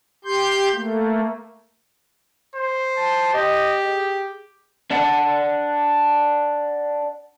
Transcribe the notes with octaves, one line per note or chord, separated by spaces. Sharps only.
G4 C6 G6
A3 A#3
C5
A5
G4 D#5
G#4
D4 D5 F#5